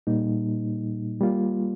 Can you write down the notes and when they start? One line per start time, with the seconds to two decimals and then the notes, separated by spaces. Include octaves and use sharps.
0.07 A#2 G3 A#3 D#4
1.21 G3 A#3 F4